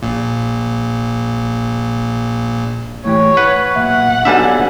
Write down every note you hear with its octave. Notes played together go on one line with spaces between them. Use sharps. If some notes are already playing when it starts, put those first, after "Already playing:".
A#1 A#2
A2 E3 G4 C#5
B4 F#5
B1 A#2 E5 F#5
B1 G3 D4 E5 G#5